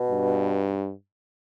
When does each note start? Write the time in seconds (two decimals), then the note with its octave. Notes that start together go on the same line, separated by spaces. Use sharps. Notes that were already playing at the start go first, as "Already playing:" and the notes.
Already playing: B2
0.10 G2